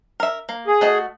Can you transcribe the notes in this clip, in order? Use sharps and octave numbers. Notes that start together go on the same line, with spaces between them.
A#4 E5
A#3
G#4
A3 F#4 D#5